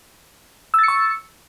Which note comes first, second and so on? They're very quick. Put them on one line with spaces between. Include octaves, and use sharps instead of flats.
E6 A6 C#7 C#6